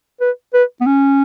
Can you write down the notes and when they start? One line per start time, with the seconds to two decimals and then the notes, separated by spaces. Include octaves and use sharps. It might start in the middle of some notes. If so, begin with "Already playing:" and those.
0.21 B4
0.54 B4
0.81 B3
0.86 C#4